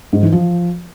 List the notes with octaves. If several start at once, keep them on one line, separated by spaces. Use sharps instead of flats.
G#2
E3
F3